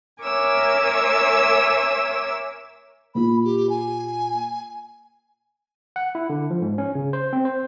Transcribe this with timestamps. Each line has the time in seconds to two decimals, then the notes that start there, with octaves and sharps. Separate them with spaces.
0.22 A#4 C#5 E5 G#5 D6 E6
3.15 A#2 A#3 F4 B5
3.45 G4
3.70 G#5
5.96 F#5
6.15 E4
6.30 D3
6.50 F3
6.62 G#2
6.78 C#4
6.95 C#3
7.13 C5
7.33 C4
7.45 C5